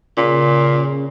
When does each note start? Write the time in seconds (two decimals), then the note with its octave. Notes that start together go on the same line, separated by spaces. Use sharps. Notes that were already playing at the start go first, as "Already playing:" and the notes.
0.17 A#2 C#3